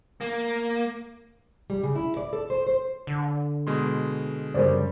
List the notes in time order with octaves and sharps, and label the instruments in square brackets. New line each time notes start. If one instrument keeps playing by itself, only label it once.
[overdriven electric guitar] A#3
[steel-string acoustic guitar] G3
C#3
E4
D5
A4
C5
C5
[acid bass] D3
[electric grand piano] B2 G#3 C6
[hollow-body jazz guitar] F#2 C#3 G3 [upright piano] A#4 C5 D5